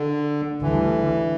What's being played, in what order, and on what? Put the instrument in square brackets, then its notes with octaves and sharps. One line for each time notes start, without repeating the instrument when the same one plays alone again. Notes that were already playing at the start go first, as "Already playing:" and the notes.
Already playing: [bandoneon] D3
[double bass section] D2 D3 G3 [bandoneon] E3